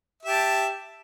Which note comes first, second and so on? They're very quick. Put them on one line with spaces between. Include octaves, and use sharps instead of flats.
E5 G4 A5